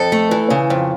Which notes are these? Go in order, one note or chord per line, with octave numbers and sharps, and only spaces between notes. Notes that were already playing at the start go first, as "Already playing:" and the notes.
Already playing: F2 A4
A3
E3
C#3
F2